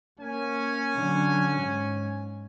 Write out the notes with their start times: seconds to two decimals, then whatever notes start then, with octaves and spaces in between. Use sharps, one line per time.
0.20 A#3 C#4 G#5
0.96 D3 F#3
1.61 G#2